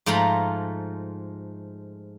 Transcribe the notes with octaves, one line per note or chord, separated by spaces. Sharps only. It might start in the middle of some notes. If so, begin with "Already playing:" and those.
G#2 F3 A3 F4 A#5 B5